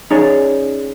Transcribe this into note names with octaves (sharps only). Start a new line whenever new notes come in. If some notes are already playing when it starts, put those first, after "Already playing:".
C#4 D#4 G#4 C#5 D5 A#5